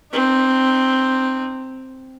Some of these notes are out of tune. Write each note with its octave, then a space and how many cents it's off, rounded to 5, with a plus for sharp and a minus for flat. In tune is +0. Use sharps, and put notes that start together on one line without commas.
C4 +0 D#4 -35